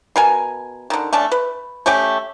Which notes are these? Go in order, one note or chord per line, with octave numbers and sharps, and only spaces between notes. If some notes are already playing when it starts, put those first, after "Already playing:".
B2 A#4 G#5
D3 D#3
A3 C#4 D4 A5
B4
A3 C#4 G4 G5